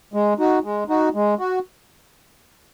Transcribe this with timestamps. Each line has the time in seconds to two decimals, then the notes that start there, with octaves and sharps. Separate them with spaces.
0.14 G#3
0.39 D#4 F#4
0.64 G#3
0.89 D#4 F#4
1.14 G#3
1.39 F#4